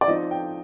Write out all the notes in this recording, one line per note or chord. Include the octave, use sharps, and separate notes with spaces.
D5
F3 C4 D#4 D#5
G5